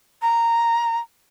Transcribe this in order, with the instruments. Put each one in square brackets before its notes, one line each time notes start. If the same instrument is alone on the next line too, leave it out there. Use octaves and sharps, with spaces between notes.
[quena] A#5